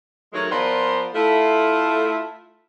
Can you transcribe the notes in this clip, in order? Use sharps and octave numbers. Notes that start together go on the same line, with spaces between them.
D#3 F#3 G#3 A3 A#4 C#5
F3 B3 F4 A#4 C5 D5
A3 E4 F4